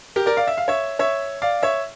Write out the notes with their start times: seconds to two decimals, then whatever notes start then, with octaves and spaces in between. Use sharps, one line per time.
0.16 G4 A#4
0.26 A#4 D5
0.37 D5 F5
0.47 E5
0.58 F5
0.68 C#5 E5
0.99 C#5 E5
1.42 D5 F5
1.63 C#5 E5